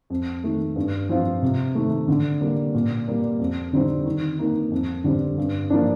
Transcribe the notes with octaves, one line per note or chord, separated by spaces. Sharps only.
F2
D#3 A3
G2
F3 C4 F4
C3
D#3 A3
D3
G3 A#3
A#2
G3 A#3
F2
D3 G3 C4 D#4
D#3
A#3 D#4
F2
D3 G3 C4
G2
F3 A#3 D4